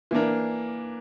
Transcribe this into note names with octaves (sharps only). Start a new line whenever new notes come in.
E3 A#3 D4 A#4